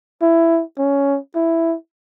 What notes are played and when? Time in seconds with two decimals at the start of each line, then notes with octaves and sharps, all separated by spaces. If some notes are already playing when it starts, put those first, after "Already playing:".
0.22 E4
0.78 C#4
1.35 E4